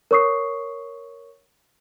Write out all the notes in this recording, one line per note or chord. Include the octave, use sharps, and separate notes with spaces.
A#4 C#5 C#6 D#6 C7